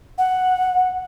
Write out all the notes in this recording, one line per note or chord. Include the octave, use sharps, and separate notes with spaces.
F#5